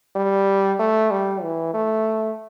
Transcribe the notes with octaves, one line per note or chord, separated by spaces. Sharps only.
G3
A3
G3
E3
A3